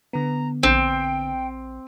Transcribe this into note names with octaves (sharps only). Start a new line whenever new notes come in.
D3 B3 A#5
A#1 C4 G5